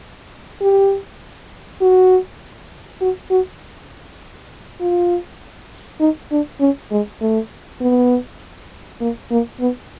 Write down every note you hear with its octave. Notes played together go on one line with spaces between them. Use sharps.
G4
F#4
F#4
F#4
F4
D#4
D4
C#4
G#3
A3
B3
A#3
A#3
B3